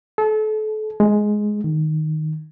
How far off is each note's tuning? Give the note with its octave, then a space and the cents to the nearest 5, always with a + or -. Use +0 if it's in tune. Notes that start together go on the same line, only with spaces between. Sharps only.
A4 -35
G#3 +10
D#3 -5